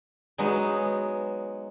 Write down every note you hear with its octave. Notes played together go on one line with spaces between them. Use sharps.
F#3 G#3 B3 D#4